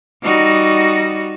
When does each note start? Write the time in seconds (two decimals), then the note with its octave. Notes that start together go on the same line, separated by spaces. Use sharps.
0.23 G3 D#4 F#4